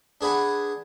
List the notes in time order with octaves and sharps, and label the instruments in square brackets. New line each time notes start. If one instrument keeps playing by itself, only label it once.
[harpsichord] D4 G#4 B4 F#5 G#5